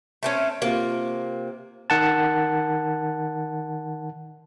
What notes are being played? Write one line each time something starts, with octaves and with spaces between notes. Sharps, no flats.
A3 C4 C#4
C3 A#3 F4
D#3 F#5 A5